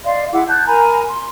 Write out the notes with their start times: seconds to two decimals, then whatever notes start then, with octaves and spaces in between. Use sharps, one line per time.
0.03 D5 D#5 F5 C6
0.32 E4 G#4 F#5 D6
0.48 A5 F#6 G6
0.66 A#4 G#5 A#5 B5
1.08 C6